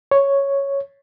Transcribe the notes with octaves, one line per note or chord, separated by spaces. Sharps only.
C#5